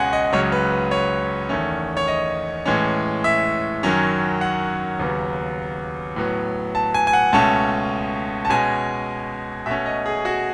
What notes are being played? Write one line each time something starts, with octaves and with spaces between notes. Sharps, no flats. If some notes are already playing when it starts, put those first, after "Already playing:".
Already playing: C#2 B2 G#3 C#4 F#5 G#5
D#5
C#2 C#3 F#3 C#5
B4
B4
C#5
E2 D#3 A3 C#4
C#5
D#5
A2 E3 G#3 C#4
E5
F#2 D#3 F#3 C#4
F#5
D#2 C#3 F#3 B3
A2 F#3 B3
A5
G#5
G#5
F#5
C#2 B2 A3 C#4 A5
A5
B2 G#3 C#4 G#5
B2 A3 C#4 E5
D#5
G#4
F#4